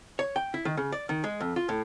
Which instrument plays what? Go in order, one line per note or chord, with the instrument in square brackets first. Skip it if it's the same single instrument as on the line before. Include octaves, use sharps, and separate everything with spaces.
[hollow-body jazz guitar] C#5
G5
E4
D#3
C#3
D5
D#3
G#3
F2
F4
A2